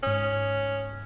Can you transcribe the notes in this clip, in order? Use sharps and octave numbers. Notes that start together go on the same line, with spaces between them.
G#2 C#4 D#6